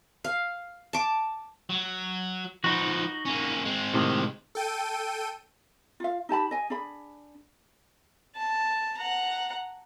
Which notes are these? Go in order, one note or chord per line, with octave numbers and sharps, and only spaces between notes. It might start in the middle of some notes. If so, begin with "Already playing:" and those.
F5
A5 D6
F#3
F3 D#4 F#4 B4
A#3 C#4
G#3 C4
A2 C3 D#3
A4 G5 D#7
F4 F5
D#4 G4 A5 B5
D#5 G#5
D4 G#4 B5
A5
F#5 A#5